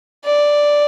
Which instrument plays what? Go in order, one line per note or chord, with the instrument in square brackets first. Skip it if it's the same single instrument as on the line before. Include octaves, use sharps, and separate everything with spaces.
[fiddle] D5